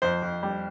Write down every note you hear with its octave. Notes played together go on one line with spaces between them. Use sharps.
F2 C5
F2
G3